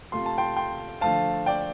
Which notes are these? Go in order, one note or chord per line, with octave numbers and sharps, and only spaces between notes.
C3 A3 F4 C6
A5
G5 C6
G5 C6
D3 F3 A3 F4 F5 A5
D5 G5